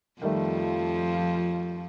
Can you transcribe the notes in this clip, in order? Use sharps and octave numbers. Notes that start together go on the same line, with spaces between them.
F2 D#3 F3 G3 A3